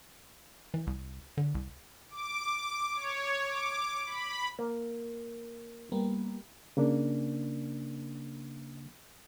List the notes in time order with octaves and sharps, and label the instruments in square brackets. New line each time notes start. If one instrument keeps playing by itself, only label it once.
[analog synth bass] E3
C2
D3
C2
[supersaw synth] D6
C#5
D6
B5
[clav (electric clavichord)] A#3
[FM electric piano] G3 A#3 B3
[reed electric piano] C#3 A#3 D4